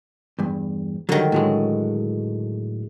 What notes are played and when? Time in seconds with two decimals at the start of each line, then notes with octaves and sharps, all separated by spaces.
0.39 E2 G2
1.09 D3 D#3 F#3 G3
1.32 A2 F#3 G#3